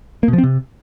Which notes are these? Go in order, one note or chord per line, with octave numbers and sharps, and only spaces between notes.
A#3
B2
F3
C4
C3